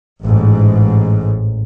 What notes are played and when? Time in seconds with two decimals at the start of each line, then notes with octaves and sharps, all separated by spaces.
0.23 A1 G#2